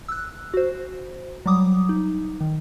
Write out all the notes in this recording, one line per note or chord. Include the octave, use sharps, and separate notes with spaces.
E6 F#6
F#4 C5
F#3 G3 D6 D#6
D#4
D#3